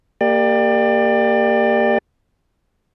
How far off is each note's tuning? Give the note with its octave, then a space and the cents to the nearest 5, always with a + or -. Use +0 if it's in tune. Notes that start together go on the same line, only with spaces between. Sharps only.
A#3 -15 G4 +15 D5 +25